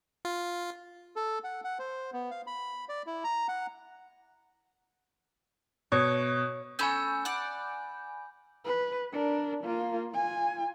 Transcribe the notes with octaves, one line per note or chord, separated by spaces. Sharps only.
F4
A4
F#5
F#5
C5
B3
F5
B5
D5
E4
A#5
F#5
B2 C#5
A3 C#4 G#5 B5 E6 G6
D5 F#5
B4
D4 A#4
A#3 F4
F4 G#5